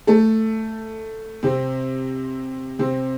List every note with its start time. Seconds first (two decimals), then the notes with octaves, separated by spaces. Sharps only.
0.07 A3 A4
1.43 C3 C4
2.79 C3 C4